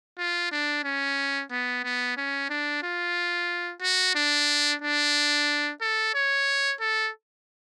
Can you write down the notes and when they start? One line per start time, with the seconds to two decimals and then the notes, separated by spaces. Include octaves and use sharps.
0.18 F4
0.52 D4
0.84 C#4
1.51 B3
1.84 B3
2.17 C#4
2.50 D4
2.83 F4
3.82 F#4
4.15 D4
4.82 D4
5.81 A4
6.14 C#5
6.81 A4